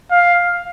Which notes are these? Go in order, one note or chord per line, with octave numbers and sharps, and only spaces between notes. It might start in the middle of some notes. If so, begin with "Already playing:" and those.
F5